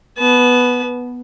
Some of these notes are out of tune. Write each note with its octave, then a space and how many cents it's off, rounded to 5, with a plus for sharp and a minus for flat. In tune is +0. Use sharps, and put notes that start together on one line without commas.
B3 +0 A5 -35